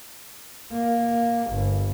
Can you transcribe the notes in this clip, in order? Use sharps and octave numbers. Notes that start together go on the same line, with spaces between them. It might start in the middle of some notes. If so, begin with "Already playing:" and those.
A#3
G1